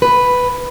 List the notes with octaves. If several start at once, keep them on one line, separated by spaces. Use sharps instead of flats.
B4